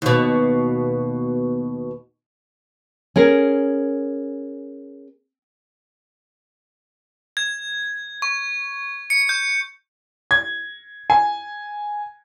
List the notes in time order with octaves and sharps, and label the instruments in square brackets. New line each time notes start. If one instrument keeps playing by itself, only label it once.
[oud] D#2 B2
[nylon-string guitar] C#4 G#4 A#4
[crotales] G#6
C#6
C#7
G6
[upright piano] G#6
G#5